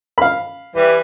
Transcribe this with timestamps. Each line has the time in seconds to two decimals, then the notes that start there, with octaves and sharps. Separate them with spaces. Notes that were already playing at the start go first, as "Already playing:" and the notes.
0.18 F5 B5
0.74 E3 G3